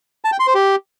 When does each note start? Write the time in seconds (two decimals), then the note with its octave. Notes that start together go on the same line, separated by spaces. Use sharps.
0.25 A5
0.32 G5
0.40 C6
0.47 C5
0.55 G4